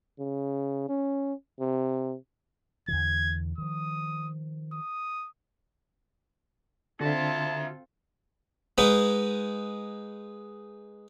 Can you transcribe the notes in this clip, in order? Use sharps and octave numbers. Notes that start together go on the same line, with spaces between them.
C#3
C#4
C3
E2 D3 E3 G#6
D#3 F3 D#6
D#6
D3 C4 F4 F#4 A4 E5 A5
G#3 D#4 B4 F#5